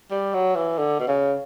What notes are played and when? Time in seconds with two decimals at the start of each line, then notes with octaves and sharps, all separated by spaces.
0.11 G3
0.34 F#3
0.55 E3
0.78 D3
1.00 B2
1.08 C#3